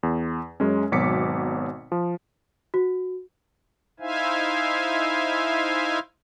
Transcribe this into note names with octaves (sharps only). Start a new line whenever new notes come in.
E2
F#2 G#3 C#4
G#1 B2 F#3 D6 B6 C#7
F3
F#4
D#4 E4 C5 E5 F5 G#5